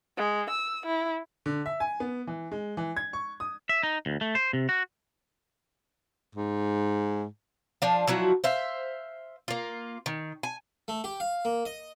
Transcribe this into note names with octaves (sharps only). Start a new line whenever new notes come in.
G#3
E6
E4
D3
E5
G#5
B3
E3
G#3
E3
G#6
C#6
D#6
E5
D#4
D2
A3
C5
C3
F#4
G#2
F3 D4 F5
F3 F#3 E4 F#4
C5 E5 F5
A#3 F4
D#3
G#5
A3
G4
F5
A#3
D#5